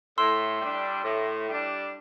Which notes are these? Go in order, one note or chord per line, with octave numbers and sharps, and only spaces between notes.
A2 C6 E6
G3 D4
A2
G3 D4